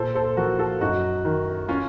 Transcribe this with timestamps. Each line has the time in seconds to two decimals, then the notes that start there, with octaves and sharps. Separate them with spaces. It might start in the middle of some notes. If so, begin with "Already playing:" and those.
Already playing: A#2 A4 C5
0.15 A4 C5
0.37 F3 F#4 A#4
0.58 F4 A4
0.81 F#2 D#4 F#4
1.25 D#3
1.69 C#4 F4